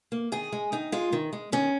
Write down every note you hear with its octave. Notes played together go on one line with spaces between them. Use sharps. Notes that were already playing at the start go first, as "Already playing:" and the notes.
A#3
D#3 G#4
G#3
D#3 D#4
G#3 F4
D#3
G#3
D#3 C#4